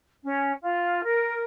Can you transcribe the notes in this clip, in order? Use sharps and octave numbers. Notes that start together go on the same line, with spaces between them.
C#4
F4
A#4